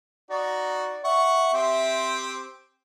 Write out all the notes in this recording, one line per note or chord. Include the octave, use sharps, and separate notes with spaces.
D#4 F#4 D5
E5 F#5 C#6
C4 G4 C5